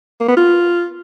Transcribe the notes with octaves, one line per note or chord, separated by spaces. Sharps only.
A#3
B3
F4